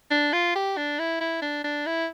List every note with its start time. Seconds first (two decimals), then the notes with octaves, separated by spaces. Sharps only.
0.11 D4
0.33 F4
0.55 G4
0.77 D4
0.99 E4
1.21 E4
1.42 D4
1.64 D4
1.87 E4